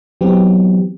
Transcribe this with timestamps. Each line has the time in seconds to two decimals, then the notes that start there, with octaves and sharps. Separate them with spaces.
0.21 E3 F#3 B3 C4 G4